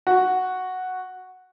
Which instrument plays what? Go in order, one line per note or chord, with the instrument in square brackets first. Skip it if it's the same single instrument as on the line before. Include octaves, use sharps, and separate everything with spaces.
[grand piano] F#4